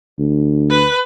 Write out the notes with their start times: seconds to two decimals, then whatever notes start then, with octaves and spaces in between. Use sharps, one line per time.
0.18 D2
0.70 B4